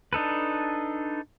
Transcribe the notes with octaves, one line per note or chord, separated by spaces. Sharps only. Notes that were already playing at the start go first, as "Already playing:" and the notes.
D4 D#4 A4 B4